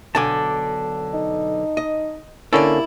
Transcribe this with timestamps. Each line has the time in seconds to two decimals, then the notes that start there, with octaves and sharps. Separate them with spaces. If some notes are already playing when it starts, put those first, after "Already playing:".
0.15 B1 D3 G#5 A5 D6
1.14 D#4
1.77 D#5
2.53 D3 A#3 C#4 E4 A4 D5